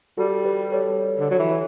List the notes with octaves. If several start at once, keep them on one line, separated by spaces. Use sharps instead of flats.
G3 F#4 A4
G4 B4
A4 C#5
D3
F#3
E3